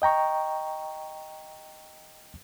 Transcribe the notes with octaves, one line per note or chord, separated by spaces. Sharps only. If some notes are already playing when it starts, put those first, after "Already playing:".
D#5 G5 A#5 C#6